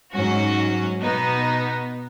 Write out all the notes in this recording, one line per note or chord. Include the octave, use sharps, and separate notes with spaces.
G#2 F#3 C#4 F#4
B2 B3 D#4